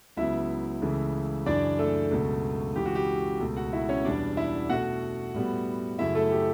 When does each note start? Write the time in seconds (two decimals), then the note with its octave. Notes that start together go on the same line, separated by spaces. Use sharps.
0.17 C#2 C#3 F#3 B3 E4 E5
0.82 C#2 C#3 E3 A3
1.46 F#2 C#3 E3 D4 D5
1.79 A3 A4
2.11 C#2 B2 F#3
2.76 C#2 C#3 E3 G4
2.85 F#4
2.95 G4
3.40 C#2 B2 A3
3.57 F#4 F#5
3.73 E4 E5
3.89 C#4 C#5
4.05 E2 B2 G3 B3 D4 D5
4.37 E4 E5
4.70 B2 A3 F#4 F#5
5.34 A2 G3 B3
5.99 F#2 C#3 F#3 A3 E4 E5
6.15 A3 A4
6.31 G4